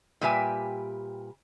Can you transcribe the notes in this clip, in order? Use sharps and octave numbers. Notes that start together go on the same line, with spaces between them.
A#2 G3 G4 B4 E5 G#5